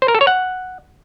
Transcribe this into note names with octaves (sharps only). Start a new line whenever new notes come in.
C5
A#4
A4
C#5
F#5